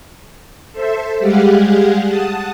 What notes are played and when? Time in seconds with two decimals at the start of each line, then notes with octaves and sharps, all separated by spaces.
0.72 A4 C5 E5
1.20 G3 G#3 G4 G#4 F5 F#5
2.04 F#5 A5 D#6